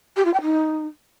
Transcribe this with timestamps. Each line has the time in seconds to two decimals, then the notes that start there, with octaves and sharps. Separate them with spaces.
0.16 G4
0.25 F4
0.33 G5
0.42 D#4